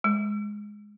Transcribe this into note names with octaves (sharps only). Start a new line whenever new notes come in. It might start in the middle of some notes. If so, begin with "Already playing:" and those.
G#3